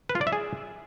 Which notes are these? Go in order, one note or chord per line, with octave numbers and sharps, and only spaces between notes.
B4
F4
D5
E5
G#4